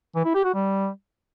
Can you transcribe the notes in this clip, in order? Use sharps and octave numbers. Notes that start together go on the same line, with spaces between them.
E3
E4
G4
F#4
G3